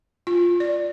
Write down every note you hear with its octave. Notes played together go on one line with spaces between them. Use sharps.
F4
D5